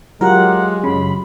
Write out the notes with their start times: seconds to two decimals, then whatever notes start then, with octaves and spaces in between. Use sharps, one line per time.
0.21 F#3 G#3 F4 G4 A#4 F#5
0.84 F#2 C#3 B5